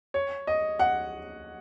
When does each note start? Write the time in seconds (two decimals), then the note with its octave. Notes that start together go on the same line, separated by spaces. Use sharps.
0.14 C#5
0.47 D#5
0.79 F#5